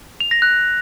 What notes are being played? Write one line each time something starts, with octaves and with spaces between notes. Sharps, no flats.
F7
A#6
F#6